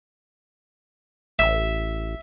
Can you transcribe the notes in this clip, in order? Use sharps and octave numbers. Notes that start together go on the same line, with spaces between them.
A1 E5